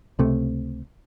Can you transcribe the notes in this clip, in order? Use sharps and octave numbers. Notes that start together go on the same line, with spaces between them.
C#2 C3 A3